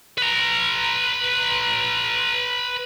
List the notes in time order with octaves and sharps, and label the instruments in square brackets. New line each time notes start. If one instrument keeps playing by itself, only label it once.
[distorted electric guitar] B4 A#5